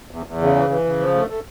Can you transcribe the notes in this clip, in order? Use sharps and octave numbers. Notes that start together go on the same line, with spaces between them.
E2
E2
C#3
E3
E3
C#3
F3
A3
A3